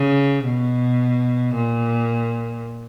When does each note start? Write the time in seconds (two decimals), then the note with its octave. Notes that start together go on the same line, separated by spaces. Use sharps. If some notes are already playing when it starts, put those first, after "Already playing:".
Already playing: C#3
0.45 B2
1.56 A#2